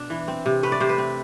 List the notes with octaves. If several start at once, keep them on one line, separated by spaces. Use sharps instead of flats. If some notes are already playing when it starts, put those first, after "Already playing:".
Already playing: B2 D4
E3
C4
C3
A3 B4
D5
C3 C5
B4
C4